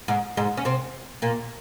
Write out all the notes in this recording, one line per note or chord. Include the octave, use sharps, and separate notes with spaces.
G#2 G#3
G#2 G#3
C#4
C3 C4
A#2 A#3